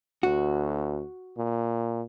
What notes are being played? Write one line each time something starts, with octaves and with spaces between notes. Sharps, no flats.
D2 F#4
A#2